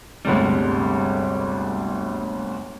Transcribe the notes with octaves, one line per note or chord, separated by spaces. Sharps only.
G1 D2 C3 G3 G#3